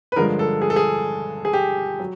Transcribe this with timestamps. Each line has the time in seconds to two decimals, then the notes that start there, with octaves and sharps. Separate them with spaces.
0.12 B4
0.16 G2 D3 F3 G#3 A#4
0.39 A4
0.62 G#4
0.70 A4
0.76 G#4
1.45 G#4
1.53 G4
1.99 F#3